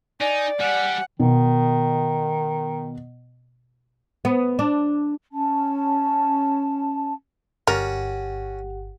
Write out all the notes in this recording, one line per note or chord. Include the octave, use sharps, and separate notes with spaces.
D#4 D5 G#5
G3 G4 F#5 G#5
B2 D#3
B3
D4
C#4 A5
G1 C#4 F#4 G4 A#4 D5 F#5